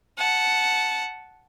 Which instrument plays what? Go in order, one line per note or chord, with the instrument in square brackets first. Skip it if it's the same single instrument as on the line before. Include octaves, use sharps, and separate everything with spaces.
[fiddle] F#5 A5